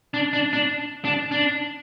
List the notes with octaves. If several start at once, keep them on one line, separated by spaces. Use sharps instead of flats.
D4
D4
D4
D4
D4